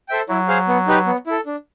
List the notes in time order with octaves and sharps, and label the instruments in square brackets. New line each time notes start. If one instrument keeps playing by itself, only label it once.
[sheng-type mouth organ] A4 C5 E5 G5
[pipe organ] F#3 [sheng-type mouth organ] E4
[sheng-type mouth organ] G#4 C5 F5
B3
D#4 G4 B4
B3
E4 A4
D4